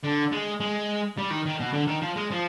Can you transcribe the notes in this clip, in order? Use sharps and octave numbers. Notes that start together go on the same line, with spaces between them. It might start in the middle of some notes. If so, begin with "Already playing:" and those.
D3
G#3
G#3
G3
D#3
D#3
B2
D3
D#3
F3
G#3
F3